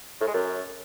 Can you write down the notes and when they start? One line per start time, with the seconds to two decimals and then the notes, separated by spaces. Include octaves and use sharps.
0.20 A2
0.27 G#3
0.34 F#2